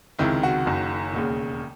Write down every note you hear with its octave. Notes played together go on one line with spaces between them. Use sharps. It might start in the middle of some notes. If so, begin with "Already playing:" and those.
C#2 C3 D#3 E4
F#4
F#1 F#2 D#3
E1 D#2 C#3